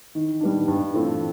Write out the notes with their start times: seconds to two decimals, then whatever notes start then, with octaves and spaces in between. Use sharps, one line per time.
0.15 D#3
0.41 G3 B3 D4
0.68 G2
0.94 E3 A3 C4 F4